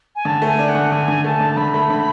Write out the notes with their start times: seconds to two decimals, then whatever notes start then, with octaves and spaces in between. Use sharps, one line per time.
0.16 G#5
0.25 D3 A5
0.42 A3
0.47 G#5
0.59 D4
0.69 F#5
0.75 D3
0.92 D3 G#5
1.08 D3
1.24 A3 A5
1.41 D3
1.57 D3 B5
1.74 A3
1.90 D3